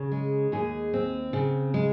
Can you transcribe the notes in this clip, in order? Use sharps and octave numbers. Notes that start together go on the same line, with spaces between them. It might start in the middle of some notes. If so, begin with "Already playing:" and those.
Already playing: C#3
G#3
D#2 G#4
C4
C#3
G#3